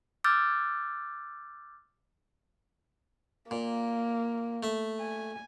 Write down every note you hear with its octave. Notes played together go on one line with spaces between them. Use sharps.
D6 E6 F6 G6 A6
A#2 A#3
A3 E5
G#5